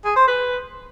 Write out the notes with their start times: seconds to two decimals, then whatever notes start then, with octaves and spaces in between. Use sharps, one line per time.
0.05 G#4
0.16 C5
0.28 B4